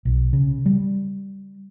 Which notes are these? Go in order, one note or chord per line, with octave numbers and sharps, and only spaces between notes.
B1
C#3
G3